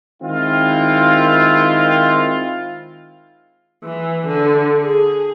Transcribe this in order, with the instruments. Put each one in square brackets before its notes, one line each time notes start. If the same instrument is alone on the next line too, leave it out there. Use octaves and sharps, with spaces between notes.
[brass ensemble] D#3 G#3 C4 E4 F4
[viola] E3
D3
G#4